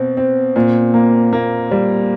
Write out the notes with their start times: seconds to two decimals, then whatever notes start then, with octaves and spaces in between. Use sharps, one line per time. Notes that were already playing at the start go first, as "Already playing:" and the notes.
Already playing: B2 C4
0.17 C4
0.56 A#2
0.94 A#3
1.33 A#3
1.71 G3